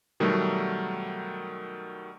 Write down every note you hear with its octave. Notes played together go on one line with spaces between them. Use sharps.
B2 D#3 F#3 G3 A3